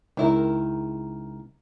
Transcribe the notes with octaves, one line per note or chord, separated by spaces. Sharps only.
C#2 D#3 E4 A#4